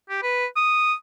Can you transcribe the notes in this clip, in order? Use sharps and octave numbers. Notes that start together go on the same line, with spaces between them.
G4
B4
D#6